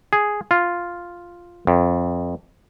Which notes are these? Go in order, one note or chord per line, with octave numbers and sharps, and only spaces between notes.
G#4
F4
F2